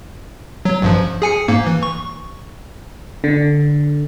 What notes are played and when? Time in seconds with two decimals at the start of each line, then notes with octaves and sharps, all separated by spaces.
0.65 F#3
0.82 A1 G2 F3
1.22 G#4 G#5 C#7
1.48 G#2 A#3
1.67 E3
1.83 C#6
3.24 D3